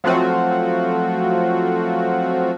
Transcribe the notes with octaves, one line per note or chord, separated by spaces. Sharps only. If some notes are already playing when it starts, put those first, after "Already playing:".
F3 F#3 A3 C4 F4 F#4